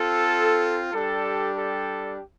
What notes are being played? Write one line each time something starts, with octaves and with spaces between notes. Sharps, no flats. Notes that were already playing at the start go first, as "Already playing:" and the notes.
Already playing: C4 F4 A4
G3 D4 G4 A4
A4